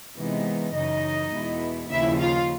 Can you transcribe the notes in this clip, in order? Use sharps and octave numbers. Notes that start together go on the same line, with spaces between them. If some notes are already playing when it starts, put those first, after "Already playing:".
C3 E3 G#3 B3 D#4
F#2 C#3 E3 D#4 D#5
E2 B2 G#3 B3 E4
D#2 C#3 F3 E4 E5
F4 F5